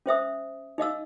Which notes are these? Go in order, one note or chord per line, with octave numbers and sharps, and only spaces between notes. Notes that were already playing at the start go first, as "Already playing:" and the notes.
C#4 C5 E5 D#6
D#4 D#5 F5 E6